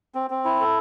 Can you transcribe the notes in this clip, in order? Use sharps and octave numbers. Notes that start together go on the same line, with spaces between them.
C4
C4
E4
A4